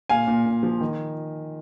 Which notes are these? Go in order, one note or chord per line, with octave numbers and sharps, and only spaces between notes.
A#2 F5 G#5
A#2
A#2
F3
D#3